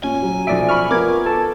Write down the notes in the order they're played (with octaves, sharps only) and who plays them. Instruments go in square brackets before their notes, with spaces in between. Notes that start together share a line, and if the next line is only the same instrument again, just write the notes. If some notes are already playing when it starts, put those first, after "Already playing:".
[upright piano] A#2 [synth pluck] C#4 [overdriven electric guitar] G#5
[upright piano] F#3
[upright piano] B1 D7 [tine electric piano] F3 D5 E5
[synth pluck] B5 C#6 F6
[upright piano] B3 F4 [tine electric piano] A#4 [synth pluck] D6 G#6
[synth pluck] A4 [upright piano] B4 [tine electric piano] A5